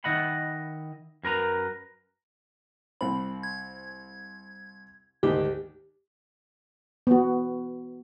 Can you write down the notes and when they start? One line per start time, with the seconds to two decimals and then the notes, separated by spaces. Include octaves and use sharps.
0.04 D#3 E4 D#5 F#5 B5
1.23 F#2 A#4 B4 A#5
3.01 C2 C4 B5
3.43 G#6
5.23 D2 G#2 D#3 G4
7.07 B3 F#4